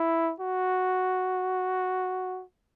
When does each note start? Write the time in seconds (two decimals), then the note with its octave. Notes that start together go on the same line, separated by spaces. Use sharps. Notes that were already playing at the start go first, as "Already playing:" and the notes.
Already playing: E4
0.40 F#4